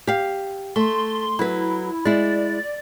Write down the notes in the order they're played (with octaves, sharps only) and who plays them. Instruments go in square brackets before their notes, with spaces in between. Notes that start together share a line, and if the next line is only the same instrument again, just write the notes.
[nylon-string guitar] G4 F5
[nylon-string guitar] A3 [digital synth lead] C6
[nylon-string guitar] F#3 B4 [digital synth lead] E4
[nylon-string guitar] G#3 E4 [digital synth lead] D5